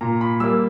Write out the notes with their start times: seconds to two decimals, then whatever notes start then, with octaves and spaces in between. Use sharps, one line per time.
0.01 A#2 A#5
0.21 B5
0.40 G3 A#3 E6